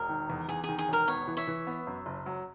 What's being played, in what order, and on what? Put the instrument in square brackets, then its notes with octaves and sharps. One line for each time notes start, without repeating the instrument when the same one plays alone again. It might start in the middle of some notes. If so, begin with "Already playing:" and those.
Already playing: [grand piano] E1 [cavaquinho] A#4
[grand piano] D#3
E2
[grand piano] E2 [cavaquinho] G#4
[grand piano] D#3 [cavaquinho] G#4
[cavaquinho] G#4
[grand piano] E1 [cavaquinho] A#4
[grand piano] B3 [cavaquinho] C#5
[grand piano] E3
[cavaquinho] C#5 E5
[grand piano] E3
B3
F#2
F#1
F#3